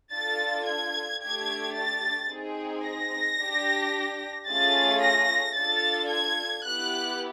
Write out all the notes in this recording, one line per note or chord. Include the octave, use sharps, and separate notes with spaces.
D4 F4 A4 A6
G#6
A3 D4 G4 G#6
A6
C4 D#4 G#4
A#6
D4 G4
A3 C#4 F4 G#4 A6
A#6
D4 F4 A4 A6
G#6
B3 E4 G4 F#6